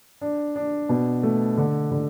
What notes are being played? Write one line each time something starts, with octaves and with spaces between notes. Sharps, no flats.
D4
D4
B2
A3
D3
D3